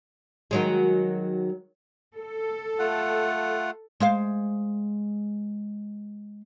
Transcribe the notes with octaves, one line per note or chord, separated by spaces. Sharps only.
D#3 F#3 G#3
A4
A3 F4 F#5
G#3 C5 F5